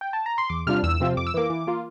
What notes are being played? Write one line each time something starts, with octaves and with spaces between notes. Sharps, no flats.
G5
A5
A#5
C6
E2 D6
C3 G3 D4 F4 F6
E2 E6
C3 F3 C4 F4
F2 D6
E6
E3 A#3 D6
E3
A#3 F4